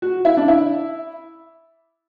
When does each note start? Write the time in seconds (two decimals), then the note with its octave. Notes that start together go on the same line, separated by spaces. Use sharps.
0.02 F#4
0.25 E4
0.37 D4
0.48 E4